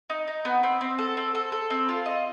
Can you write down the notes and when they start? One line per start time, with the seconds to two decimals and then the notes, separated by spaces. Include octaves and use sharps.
0.10 D#4
0.28 D#4
0.45 B3
0.63 C4
0.81 C4
0.98 A4
1.17 C4
1.35 A4
1.52 A4
1.70 C4
1.89 F4
2.06 D#5